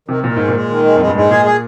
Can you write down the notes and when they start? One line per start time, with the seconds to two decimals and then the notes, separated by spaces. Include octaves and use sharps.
0.08 C3 D#3
0.24 A#2 D#3
0.36 G#2 G#3
0.48 A#2
0.54 G#3
0.69 D#3
0.85 G#3
0.95 F2 G#3
1.07 G2
1.15 G#2 G#3
1.31 A#2 G#4
1.46 G#4